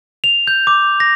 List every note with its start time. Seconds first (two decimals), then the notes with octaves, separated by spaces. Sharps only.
0.24 F7
0.47 G6
0.67 D6
1.00 A#6